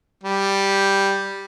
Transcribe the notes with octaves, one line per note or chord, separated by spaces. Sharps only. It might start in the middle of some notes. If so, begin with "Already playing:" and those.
G3